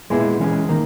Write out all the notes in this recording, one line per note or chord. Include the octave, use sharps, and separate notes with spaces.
A#2 G#3 B3 E4 G#4
E3 G#3 C#4 G#4
D#3 A#3